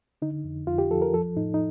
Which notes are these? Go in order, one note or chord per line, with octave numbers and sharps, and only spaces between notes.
D3 D#4
F2
F2 F4
G4
F3 A4
A#4
F3 A4
A2 D#4
D#4